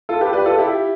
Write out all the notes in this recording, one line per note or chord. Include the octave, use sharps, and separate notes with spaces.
F4 A4
G4 B4
B4 D5
F4 A4
E4 G4